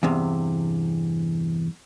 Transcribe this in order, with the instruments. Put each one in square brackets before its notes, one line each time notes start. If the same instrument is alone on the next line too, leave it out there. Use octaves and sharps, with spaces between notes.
[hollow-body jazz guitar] E2 G2 C3